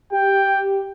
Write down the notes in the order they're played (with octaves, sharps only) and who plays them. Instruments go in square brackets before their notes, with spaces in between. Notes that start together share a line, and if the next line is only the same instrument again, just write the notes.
[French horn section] G4 [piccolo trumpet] G5